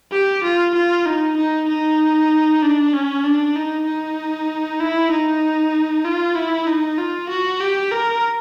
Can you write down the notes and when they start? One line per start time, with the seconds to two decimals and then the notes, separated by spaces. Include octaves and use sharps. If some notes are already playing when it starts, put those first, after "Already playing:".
0.12 G4
0.43 F4
0.74 F4
1.05 D#4
1.36 D#4
1.68 D#4
2.62 D4
2.93 C#4
3.24 D4
3.55 D#4
3.86 D#4
4.80 E4
5.11 D#4
6.04 F4
6.35 E4
6.67 D#4
6.98 F4
7.29 F#4
7.60 G4
7.92 A#4